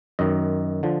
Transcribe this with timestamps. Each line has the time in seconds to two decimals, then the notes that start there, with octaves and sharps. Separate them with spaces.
0.19 F#2 D#3 D#5
0.83 D3 F3